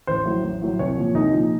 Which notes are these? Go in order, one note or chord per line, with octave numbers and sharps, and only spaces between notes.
A1 C5
A2 F#3
A1
A2 F#3
C2 C#5
A#2 F3
C2 D#4
A#2 F3